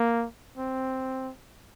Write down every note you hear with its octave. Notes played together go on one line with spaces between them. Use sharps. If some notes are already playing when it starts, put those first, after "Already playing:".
Already playing: A#3
C4